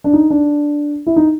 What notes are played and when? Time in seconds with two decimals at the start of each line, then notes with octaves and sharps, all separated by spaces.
0.04 D4
0.13 D#4
0.30 D4
1.06 E4
1.16 D#4